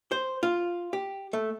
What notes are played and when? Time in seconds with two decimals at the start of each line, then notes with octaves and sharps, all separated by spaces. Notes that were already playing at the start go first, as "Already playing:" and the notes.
0.12 C5
0.43 F4
0.93 G4
1.33 A3